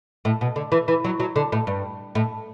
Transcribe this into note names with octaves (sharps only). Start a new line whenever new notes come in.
A2
B2
D3
E3
E3
F#3
F#3
D3
A2
G2
A2